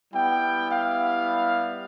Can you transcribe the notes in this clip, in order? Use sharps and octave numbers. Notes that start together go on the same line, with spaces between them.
G3 B3 E4 G5
F5